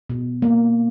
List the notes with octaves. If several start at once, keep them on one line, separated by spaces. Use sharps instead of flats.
B2
A#3